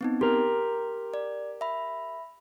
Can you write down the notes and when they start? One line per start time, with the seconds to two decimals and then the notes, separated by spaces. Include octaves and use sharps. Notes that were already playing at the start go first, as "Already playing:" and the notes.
0.01 B3 C4 D#4
0.21 G4 A#4 C6
1.14 D5
1.61 E5 B5